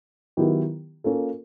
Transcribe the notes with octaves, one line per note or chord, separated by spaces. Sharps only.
D#3 F#3 B3 E4 G4
A#3 C#4 F4 A4